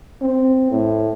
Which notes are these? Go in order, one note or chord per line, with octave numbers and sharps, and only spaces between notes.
C4
A2